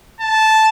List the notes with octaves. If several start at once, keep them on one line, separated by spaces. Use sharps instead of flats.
A5